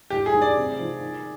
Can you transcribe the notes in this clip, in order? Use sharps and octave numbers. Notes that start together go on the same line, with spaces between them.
G#2 G4
G#4
D#3 G3 D4
D5
C3
F3 C4 D#4
D#3